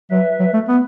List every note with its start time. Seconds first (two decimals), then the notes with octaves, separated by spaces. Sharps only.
0.11 F#3 B4 E5
0.40 F#3
0.54 A3
0.68 B3